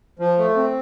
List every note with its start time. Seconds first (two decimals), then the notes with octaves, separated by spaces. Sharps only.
0.19 F3
0.38 A3
0.57 C4